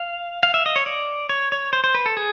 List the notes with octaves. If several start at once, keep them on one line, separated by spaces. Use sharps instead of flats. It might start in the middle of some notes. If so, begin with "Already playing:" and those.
Already playing: F5
F5
E5
D#5
C#5
D5
C#5
C#5
C5
C5
B4
A4
G#4